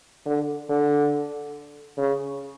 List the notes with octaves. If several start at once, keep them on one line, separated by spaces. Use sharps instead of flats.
D3
D3
C#3